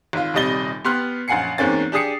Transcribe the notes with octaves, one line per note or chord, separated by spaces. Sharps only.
G#1 F4
D#1 C3 G3 D#5 A6 G7
B3 G4 C6 F6 F#6
A#1 F#2 F#5 G#5 C7 C#7
E2 G#2 A#3 C4 C#4 A6
D4 G4 G#4 D#6 C7 C#7